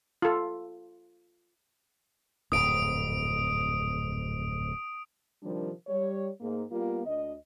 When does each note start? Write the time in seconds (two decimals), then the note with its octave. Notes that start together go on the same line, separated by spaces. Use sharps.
0.22 F4 A4
2.52 D1 F2 G#2 D#6 D7
5.43 C3 D#3 F3 G3 D4 A#4
5.87 G3 C#5
6.41 G#2 A#3 G#4
6.72 G3 A#3 B3 F4
7.06 D2 D#5